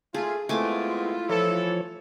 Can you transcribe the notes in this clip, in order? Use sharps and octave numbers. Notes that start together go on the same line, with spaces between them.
A3 F4 G#4
G#3 A3 B3 C4 E4 F4 G#5 D6
E3 F3 A4 C#5